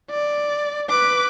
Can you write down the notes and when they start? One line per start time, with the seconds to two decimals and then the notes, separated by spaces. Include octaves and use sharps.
0.10 D5
0.89 B4 D6